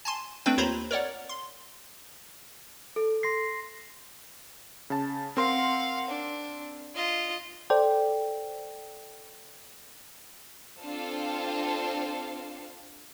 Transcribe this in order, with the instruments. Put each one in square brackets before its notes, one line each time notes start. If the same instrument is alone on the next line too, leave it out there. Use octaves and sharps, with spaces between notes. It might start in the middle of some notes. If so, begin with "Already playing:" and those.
[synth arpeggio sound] G#5 A5 C6
A3 C4 D4 B4 G5
D#2 F4 C5 C#5 A#5 B5
A#4 C#5 D5 F#5
C6
[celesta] A4
[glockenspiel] C6 A#6 C7
[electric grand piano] C#3 A5
[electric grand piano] C4 A#4 C6 [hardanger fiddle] F5 F#5
[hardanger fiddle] D4
F4 D#5
[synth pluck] A4 C5 D5 G5
[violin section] C4 D4 F4 A4 C5 F5